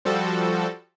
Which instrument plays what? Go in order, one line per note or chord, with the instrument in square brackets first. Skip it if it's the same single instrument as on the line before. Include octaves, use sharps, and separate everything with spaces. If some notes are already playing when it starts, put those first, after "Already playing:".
[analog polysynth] F3 G3 F#4 A4